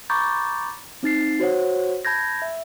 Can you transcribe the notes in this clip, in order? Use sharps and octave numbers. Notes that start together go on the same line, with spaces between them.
A#5 B5 C#6 D6 G6 A6
C4 D#4 A6 C7
F#4 C5 C#5 F#5
A5 B5 G6 G#6 A#6
E5